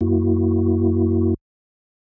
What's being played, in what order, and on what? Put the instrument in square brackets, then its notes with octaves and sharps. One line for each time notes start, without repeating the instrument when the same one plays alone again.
[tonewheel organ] F#2 A#3 E4 F#4